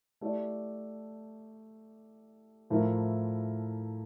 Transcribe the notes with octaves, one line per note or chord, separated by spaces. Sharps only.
A3 E4 G4 D5
A2 F3 A3 E4 A#4